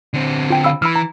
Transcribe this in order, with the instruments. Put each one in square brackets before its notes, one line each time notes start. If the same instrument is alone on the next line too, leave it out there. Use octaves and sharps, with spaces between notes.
[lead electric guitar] D3 C4
[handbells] F4 G5
F5 B5 E6
[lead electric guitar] E3 [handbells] B5 E6 F6
[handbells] A#5